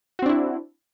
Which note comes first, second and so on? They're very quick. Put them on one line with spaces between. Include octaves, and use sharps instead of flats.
F#4 C4 D4 E4